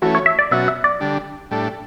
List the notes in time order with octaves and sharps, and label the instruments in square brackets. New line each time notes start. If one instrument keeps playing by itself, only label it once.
[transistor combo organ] E3 A3 C#4 [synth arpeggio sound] F#4
[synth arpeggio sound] C#5
E5
D5
[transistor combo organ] B2 F#3 C#4 F#4 [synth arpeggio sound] E5
[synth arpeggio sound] E5
D5
[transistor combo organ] D3 G3 D4
A2 G3 D4 A4